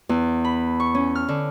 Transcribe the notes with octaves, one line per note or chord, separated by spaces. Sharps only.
E2
B5
C#6
C#4
F6
D3